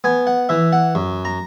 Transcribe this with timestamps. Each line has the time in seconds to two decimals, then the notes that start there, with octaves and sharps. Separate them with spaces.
0.04 B3 G#5
0.27 F#5
0.49 E3 E5
0.73 F#5
0.95 F#2
1.25 A#5